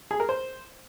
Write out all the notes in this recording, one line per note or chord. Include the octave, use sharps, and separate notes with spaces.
G#4
A#4
C5